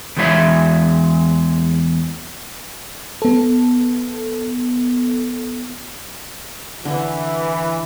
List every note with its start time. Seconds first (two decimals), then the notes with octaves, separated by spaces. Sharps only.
0.17 E2 E3 G#3 C#5 E5 B5
3.22 B3 A4
6.85 D3 E3